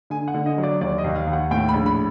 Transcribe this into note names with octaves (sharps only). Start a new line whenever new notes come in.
D3 G#5
F#5
D3
D#5
F#3
D5
D#2 D5
D#5
D#2
F5
D#2
F#5
A2 G5
B5
A#1
B5